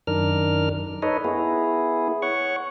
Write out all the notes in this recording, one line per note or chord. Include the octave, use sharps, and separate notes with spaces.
F#2 D#3 D4 A#4 F6
D#4 A4 B4 C#5 D#5
B3 E4 G#4
C#5 F#5 C#6